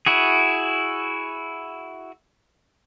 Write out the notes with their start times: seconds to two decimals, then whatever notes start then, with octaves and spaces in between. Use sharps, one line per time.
0.06 E4 F#4 G#4